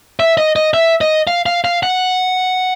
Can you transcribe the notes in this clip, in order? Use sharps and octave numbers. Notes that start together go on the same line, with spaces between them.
E5
D#5
D#5
E5
D#5
F5
F5
F5
F#5